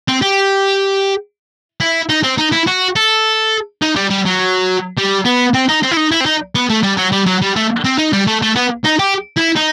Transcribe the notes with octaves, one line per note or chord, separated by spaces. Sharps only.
C4
G4
E4
D#4
C4
D#4
E4
F#4
A4
D#4
G3
G3
F#3
G3
B3
C4
D#4
C4
E4
D#4
E4
C4
D#4
B3
A3
G3
F#3
G3
F#3
G3
A3
C4
D#4
G3
A3
A3
B3
D#4
G4
E4
D#4